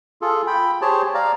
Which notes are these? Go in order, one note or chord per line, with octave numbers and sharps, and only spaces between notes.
F4 G#4 A4
G5 B5
G4 G#4 C5 C#5 A5
D5 F5 A#5